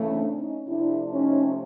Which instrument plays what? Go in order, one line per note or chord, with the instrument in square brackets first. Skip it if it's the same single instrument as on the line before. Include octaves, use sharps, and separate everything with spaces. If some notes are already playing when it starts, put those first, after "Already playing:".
Already playing: [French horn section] C#3 E3 A3
[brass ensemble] C4 D4
C#4 D#4
[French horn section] C3 F3 A3 [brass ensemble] D4 E4
[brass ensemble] C#4 D#4